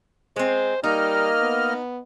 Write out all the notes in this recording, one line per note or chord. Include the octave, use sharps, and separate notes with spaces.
G#3 C4 C5
G3 A#3 D#4 D#5 F6
B3